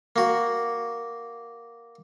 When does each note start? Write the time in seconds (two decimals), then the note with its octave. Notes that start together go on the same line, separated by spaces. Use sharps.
0.16 A#3 F#4